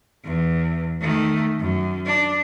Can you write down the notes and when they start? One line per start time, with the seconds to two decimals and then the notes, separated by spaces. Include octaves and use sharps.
0.24 E2
1.00 D#3 A3
1.59 F#2
2.05 D4